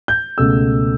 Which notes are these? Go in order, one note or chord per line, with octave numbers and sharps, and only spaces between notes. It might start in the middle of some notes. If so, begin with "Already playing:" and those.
G6
C#2 B2 A3 E6